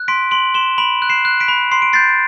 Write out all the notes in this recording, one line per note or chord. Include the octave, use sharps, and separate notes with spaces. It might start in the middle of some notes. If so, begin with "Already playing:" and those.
Already playing: F#6
C6 B6 D7
C6 D7 F#7
C6 E7 G7
B5 D7 F#7
F#6
C7 E7
F#6
B6 D7
B5
C6 C7
D7
G6 A6 C7